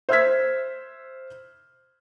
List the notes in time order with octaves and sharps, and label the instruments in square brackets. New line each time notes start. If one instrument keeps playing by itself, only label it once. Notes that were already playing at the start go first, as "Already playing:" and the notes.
[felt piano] C5 E5 E6 F6 G#6 B6